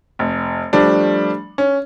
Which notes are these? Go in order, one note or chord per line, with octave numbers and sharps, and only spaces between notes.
F1
F3 G3 A3 D4
C#4